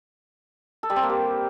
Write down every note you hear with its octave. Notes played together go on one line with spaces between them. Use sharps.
A4
G3
C4
A#3
G4